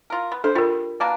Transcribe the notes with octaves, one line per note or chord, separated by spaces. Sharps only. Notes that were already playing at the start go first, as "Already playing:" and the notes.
F4 A#4
B3
D4 A4 C5
G3 F4 A#4
B2 A#3 D4